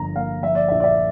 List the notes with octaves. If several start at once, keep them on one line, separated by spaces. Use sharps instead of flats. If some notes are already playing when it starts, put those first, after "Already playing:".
Already playing: G1 F3 A#5
A#3 F5
F3 E5
D5
A#1 E5
D5
E5